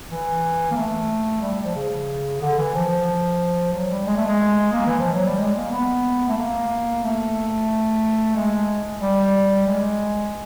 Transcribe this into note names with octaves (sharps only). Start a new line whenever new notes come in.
E3
A#3
A3
G3
F3
C#3
D3
E3
F3
F#3
G3
G#3
A3
G#3
A#3
E3
F3
F#3
G3
G#3
A#3
B3
A3
A#3
A3
G#3
G3
G#3